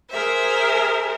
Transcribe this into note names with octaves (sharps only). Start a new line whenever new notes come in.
G#4 A#4 C5 E5